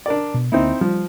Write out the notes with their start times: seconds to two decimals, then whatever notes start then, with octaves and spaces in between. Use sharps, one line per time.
0.06 D4 A#4 D5
0.34 B2
0.52 D2 A#3 C4 D#4 E4
0.81 F3 G3